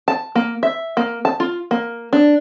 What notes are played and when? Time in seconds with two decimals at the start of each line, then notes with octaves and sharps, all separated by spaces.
0.08 A5
0.35 A#3
0.63 E5
0.97 A#3
1.25 A5
1.40 F4
1.71 A#3
2.13 D4